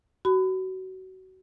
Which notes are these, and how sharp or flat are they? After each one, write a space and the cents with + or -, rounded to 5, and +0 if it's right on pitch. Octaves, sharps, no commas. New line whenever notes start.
F#4 +25 B5 +30